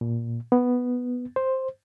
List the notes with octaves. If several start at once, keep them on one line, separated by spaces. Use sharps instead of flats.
A#2
B3
C5